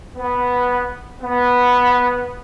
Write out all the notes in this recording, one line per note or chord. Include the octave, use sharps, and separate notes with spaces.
B3
B3